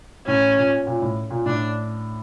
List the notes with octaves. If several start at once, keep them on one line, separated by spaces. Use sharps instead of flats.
A2 C#4
A#2
A#2
A2
A#2
A2 D4